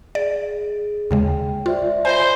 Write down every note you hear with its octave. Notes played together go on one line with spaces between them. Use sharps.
G#4 D5
D#2 C#3 G#3 G5
F4 C5 D5 E5
C5 D5 D#5 G#5 B5